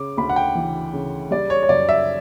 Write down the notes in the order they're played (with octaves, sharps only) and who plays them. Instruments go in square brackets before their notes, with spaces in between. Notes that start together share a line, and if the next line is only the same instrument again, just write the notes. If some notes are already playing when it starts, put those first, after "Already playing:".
Already playing: [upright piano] C#3 D6
D2 B5
F#5
G5
E3
C#3
G3 D5
C#5
C#5
F#2 D5
E5